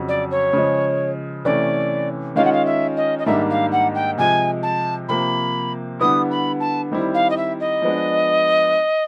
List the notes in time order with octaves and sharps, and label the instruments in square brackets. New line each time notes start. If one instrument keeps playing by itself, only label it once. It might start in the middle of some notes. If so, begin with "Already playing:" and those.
Already playing: [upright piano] F2 C#3 F#3
[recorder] D5
C#5
[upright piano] C#3 F3 G#3
[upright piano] C3 E3 A3 C#4 [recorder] D5
[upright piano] D#3 G#3 C#4 F4 [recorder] F5
[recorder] F#5
F5
E5
D#5
D#5
[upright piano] G#2 D#3 G3 A#3 D4 [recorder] E5
[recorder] F5
F#5
G5
[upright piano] C3 F3 G#3 [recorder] G#5
[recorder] A5
[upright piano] C3 F3 A#3 [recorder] B5
[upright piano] D3 G3 B3 E4 [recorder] D#6
[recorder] B5
A5
[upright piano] D#3 G3 C4 E4
[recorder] F5
D#5
E5
D#5
[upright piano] F3 G#3 B3 D4